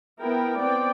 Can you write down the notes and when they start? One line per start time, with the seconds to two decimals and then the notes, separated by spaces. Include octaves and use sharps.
0.20 B3 E4 A#4 G5
0.60 B3 C4 D5 G5